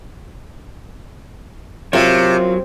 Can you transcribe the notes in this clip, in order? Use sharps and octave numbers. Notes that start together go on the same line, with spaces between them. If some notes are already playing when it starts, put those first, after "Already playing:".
C3 F#3 C4 F4 A#4 C#5